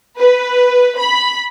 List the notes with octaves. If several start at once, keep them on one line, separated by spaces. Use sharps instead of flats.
B4
B5